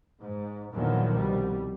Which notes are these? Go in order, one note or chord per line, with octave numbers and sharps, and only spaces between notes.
G#2
E2 A#2 D3 D#3 F3 F#3
C2 B2 G3